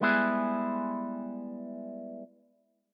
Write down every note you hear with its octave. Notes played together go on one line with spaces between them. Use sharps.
G3 G#3 B3 E4 G#4